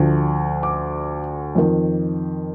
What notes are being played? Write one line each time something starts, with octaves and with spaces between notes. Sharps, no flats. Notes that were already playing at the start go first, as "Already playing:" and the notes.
Already playing: D2 D3 F3
D6
F2 D#3